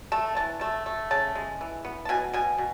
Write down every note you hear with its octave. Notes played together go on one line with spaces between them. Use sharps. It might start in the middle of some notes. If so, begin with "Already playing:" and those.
A3 A5
E3 A5
A3 A5
A3
C#3 A5
G#3
E3
B3
A5
B2 G#5
B2 G#5
B2